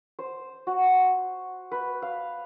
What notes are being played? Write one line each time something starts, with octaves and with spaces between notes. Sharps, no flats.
C5
F#4
B4
F5